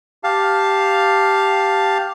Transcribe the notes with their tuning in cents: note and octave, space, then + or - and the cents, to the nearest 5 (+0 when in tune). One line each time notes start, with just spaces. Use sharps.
G4 +0 F5 +0 A5 +0